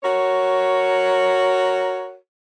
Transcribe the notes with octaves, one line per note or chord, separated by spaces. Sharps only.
F#4 A#4 C#5